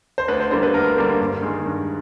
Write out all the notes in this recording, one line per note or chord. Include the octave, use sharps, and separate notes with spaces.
C5
D2 B4
C5
D3 G3 A#3 C5
B4
D2 A#4
D3 G3 A#3
G2
D#3 G#3
G2